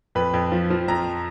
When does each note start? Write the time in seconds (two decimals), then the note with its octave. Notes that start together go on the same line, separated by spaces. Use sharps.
0.15 F2 B4
0.34 F2
0.52 F3
0.70 F3
0.88 F2 A#5